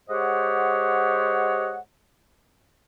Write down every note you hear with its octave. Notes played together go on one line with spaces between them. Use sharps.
G#3 G4 C5 C#5 D#5 F#5